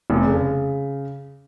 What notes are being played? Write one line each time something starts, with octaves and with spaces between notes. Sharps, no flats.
F1
C#3